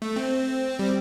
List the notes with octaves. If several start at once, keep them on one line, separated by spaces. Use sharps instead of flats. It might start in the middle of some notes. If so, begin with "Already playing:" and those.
A3
C4
G3